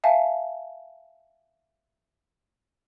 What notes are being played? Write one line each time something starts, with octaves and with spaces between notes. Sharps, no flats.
E5 F5 G#5 A5